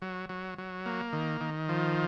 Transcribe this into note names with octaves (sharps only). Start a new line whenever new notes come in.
F#3
F#3
F#3
A#3
D#3
D#3
F3